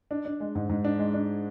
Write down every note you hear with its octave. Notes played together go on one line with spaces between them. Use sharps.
D4
D4
G#3
G#2
G#2
D4
G#3
D4